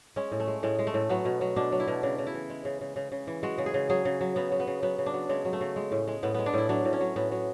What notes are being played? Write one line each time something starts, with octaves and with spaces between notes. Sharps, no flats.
G#3 C#4
A2
A3
G#3
A2 G#3
G#3
A3
A2
F#3 B3
B2
F#3
B2 D4
F#3
E4
B2
C#3 D4
C#3
E4
E3
G#3
C#3
C#3
C#3
C#3
E3
G#3 F#4
C#3
G#4
C#3
F#3 G#4
C#3
F#3
C#3 B3
F#3
B3
C#3
F#3 B3
C#3
D4
F#3
C#3 G#3
F#3
A3
C#3
G#3
A2
G#3
A2 B3
G#3 B3
D4
A2 E4
F#3 D4
A2
C#4
F#3
A2 B3
F#3